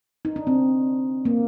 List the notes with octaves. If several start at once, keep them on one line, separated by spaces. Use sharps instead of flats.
D#4
D4
C4
A#3